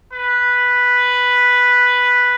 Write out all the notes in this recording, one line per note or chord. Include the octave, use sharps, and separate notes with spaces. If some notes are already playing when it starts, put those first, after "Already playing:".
B4